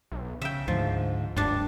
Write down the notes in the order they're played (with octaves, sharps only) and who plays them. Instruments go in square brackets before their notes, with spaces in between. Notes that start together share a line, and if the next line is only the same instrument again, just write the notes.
[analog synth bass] B1
[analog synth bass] C#3 [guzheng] E5 G5
[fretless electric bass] D2 [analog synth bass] G#2 [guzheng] F3
[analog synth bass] F1 [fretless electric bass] G2 [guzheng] G3 D4